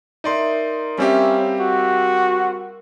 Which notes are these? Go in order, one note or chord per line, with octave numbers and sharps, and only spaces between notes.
D#4 A#4 D5 E5 C6
G3 C4 C#4 G4 E5 F5
F#4